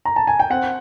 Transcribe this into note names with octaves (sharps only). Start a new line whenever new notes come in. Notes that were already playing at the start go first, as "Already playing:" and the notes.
A#5
A5
G#5
G5
C4 F#5